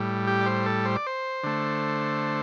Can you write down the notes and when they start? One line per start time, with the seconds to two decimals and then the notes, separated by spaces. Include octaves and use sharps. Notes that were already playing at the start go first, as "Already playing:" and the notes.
Already playing: A2 G3
0.27 G4
0.41 D5
0.46 C5
0.66 A4
0.85 C5
0.96 D5
1.07 C5
1.44 D3 A3